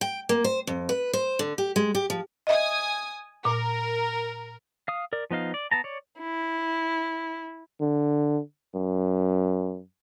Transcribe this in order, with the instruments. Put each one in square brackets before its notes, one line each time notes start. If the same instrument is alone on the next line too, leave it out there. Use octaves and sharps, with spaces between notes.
[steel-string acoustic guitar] G5
A#3
C5
F2
B4
C5
D3
G4
G#3
G4
F3
[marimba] D#5 E5 [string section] G#5 D#6
[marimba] A#2 [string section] A#4
[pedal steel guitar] F5 D#6
A#4 D5
F3 B3 D#4 F5
D5
B3 A5 A#5
C#5 D5
[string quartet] E4
[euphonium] D3
F#2